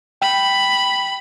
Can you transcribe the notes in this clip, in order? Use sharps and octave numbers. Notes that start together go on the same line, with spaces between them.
G5 B5